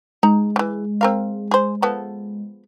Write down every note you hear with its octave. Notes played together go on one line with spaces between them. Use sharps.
G#3 D#4 A#5
C#3 E3
C4 A#4 F5
G#4 C5
F3 B3 A4